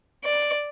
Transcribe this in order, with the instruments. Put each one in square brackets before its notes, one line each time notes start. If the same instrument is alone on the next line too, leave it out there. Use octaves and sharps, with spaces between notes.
[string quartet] D5